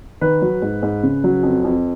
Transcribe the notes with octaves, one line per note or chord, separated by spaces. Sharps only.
D#3 B4
F#3
G#2
G#2
C#3
F#3
F2
F2